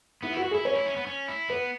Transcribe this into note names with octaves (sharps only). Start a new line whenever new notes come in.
B3 E4
E4 F#4
F#4
G#4
E4
C#4 C#5
E4
C#4
B3
C#4
E4
B3 B4